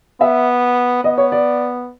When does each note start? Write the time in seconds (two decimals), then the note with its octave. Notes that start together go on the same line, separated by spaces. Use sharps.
0.21 B3 E5
1.04 B3 D#5
1.18 C#5
1.32 D5